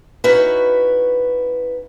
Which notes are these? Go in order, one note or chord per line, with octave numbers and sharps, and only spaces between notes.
C#4 D#4 E4 F#4 B4